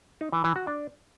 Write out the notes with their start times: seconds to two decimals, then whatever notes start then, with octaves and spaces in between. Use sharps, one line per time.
0.21 D#4
0.32 E3
0.44 E3
0.56 F#4
0.67 D4